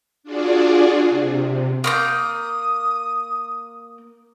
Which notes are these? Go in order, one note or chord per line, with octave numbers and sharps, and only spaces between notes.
D4 F4 F#4 G#4 D5
C3
A#3 C6 D#6 G6